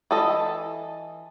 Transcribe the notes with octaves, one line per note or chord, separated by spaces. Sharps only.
E3 A4 D#5